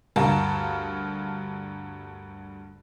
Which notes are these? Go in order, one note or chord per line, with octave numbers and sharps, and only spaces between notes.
D2 G2 A#4 F5 A5